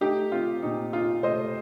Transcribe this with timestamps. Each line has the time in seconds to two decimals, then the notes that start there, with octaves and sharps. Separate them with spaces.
0.01 A3 D#4 G4
0.32 C4 F4
0.62 A#2 D#4
0.93 D#4 F4
1.23 A3 C5 D#5